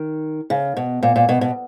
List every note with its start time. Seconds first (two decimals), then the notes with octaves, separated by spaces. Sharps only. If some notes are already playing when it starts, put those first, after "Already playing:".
Already playing: D#3
0.50 C#3
0.77 B2
1.03 A#2
1.16 A#2
1.29 B2
1.41 B2